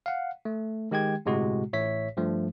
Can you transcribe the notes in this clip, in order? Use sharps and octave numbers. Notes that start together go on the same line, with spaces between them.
F5 F#5
A3
D#3 G#3 G4 G5 G#6
G1 A2 C3 G#3 F#4
A1 A2 C#5 E5 B6
G2 F3 A3